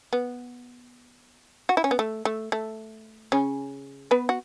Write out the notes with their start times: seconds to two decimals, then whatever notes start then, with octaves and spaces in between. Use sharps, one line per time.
0.13 B3
1.69 F#4
1.77 E4
1.84 C#4
1.91 B3
1.99 A3
2.25 A3
2.52 A3
3.32 C#3 C#4
4.11 B3 B4
4.29 F#4